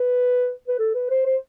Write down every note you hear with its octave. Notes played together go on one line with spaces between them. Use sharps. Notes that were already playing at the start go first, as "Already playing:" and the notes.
Already playing: B4
B4
A4
B4
C5
C5